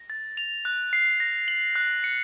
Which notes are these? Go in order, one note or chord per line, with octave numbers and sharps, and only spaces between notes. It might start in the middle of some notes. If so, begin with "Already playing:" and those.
Already playing: A#6
A6
F7
F#6
C7
A#6
F#7
F#6
C#7